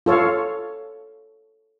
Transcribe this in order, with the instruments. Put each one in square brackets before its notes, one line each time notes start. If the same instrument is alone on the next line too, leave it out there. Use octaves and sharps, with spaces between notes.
[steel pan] F4 A4 C#5 F5